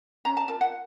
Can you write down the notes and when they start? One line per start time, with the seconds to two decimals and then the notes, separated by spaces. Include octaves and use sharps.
0.25 C#4 A#5
0.37 A5
0.48 F4 A#4 A5
0.61 F#5